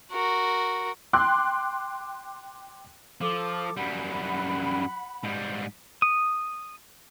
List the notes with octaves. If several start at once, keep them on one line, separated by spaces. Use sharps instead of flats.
F#4 A#4
G5 C6 D6 F#6
F3 A4 D6
F#2 G3 F#5 B5
G#2 G3
D#6